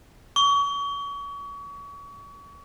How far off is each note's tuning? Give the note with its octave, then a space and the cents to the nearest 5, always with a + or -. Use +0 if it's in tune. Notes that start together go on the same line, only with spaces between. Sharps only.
C#6 +35